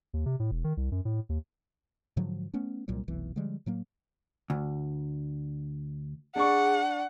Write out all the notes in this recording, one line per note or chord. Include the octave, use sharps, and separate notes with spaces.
D#2
C3
A2
E1
D#3
C2
F#2
A2
D#2
G#2 D3 F3 F#3
A3 B3 C#4
C2 A#2 F#3 G3
F1 B1 E3
D3 F3 G3 G#3
A2 F#3 A#3
D2
D4 G#4 D5 F#5 C#6